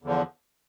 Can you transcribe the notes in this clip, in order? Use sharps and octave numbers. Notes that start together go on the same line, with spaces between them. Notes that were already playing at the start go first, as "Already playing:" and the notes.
E2 D3 F3